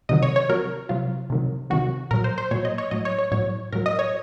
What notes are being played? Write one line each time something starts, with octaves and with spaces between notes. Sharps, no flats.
C3 D#3 F#3 D#5
C#5
C#5
C3 F#3 A#4
C3 F#3 F4
C3 D#3 F#3
C3 D#3 F#3 F#4
A#2 F#3 A#4
C5
C5
A#2 F#3 C#5
D#5
C#5
A2 F#3 D#5
C#5
C#5
A2 F#3 C#5
A2 F#3 A#4
D#5
C#5